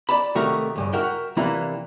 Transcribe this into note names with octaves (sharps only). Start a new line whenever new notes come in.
D5 A5 B5
C3 D#3 A3 F#4 G4 A#4
D2 G2 C#3
F#4 A#4 E5 F#5 G5
C3 E3 A#3 D4 E4 A#5